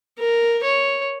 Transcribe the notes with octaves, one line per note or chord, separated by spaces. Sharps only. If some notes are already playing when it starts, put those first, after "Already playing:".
A#4
C#5